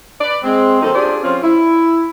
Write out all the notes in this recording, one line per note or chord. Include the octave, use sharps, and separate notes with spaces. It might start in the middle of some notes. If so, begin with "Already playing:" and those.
B4 D5
G#3 C4
D#3 F#3 A#3 C4 D#4 A4
D4 F4 G4 G#4 C5 D5
F3 C4 C#4 F4
E4